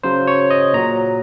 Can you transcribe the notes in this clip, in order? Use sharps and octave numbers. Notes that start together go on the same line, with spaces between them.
C#3 F#3 C5
C#5
D#5
A#2 F#3 A#5